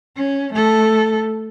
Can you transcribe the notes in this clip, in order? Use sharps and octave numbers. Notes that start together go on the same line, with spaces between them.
C#4
A3 A4